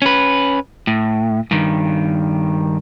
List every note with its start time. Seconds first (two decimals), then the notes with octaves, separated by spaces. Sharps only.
0.02 C#4 B4
0.87 A2
1.51 G2 D#3